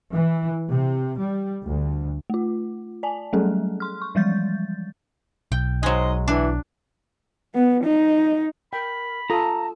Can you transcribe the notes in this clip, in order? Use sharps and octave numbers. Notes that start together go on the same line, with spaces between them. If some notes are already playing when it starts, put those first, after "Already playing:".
E3
C3
G3
D2
A3 F4
D5 G#5 A5
F#3 G3 A3 C#4 G#4 A4
C6 F6
C#6
E3 F3 G3 G#3 G6 A6
B1 G5
F#3 G#3 D#4 C5 D#5
E3 D4
B3
D#4
A#4 G5 B5
F4 A4 A5 A#5 D#6